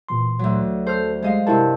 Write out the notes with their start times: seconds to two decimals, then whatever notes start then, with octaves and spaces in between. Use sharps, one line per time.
0.09 A#2 E3 C6
0.39 D2 F#3
0.87 A4 C5 F6
1.22 G3 G#3 D#5 F5
1.47 G2 C3 E4 A#4 A5